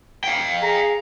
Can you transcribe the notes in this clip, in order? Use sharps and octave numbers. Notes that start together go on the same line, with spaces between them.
F5 G5
G#4 A#5